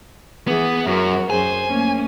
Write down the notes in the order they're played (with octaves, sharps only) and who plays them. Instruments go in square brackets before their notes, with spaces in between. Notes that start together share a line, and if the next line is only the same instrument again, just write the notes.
[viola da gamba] E3 G#4 [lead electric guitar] B3
[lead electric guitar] F#2 [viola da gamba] F#4 A#4
[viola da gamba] F#2 G#4 C5 [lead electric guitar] G#5
[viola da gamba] A3 A#3 C#4